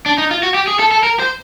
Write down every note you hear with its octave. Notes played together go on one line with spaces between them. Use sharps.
D4
D#4
F4
F#4
G4
G#4
A4
A4
A#4
C5